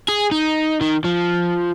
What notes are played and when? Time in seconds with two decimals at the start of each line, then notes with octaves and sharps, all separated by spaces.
0.08 G#4
0.31 D#4
0.81 D#3
1.05 F3